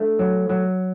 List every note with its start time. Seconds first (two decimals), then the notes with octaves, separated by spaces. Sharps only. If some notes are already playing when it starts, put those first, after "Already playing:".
Already playing: A3 D4
0.19 F#3
0.49 F#3